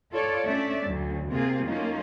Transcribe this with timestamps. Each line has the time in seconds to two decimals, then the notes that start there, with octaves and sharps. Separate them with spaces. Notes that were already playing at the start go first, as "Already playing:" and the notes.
0.11 F4 A4 C#5 D5
0.45 A3 C#4 D4 D5 E5
0.86 D2 F#3
1.28 C3 A#3 F4 G#4
1.66 F#3 A3 A#3 C#4 D#4 F4